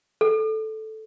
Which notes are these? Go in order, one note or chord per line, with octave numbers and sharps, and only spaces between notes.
A4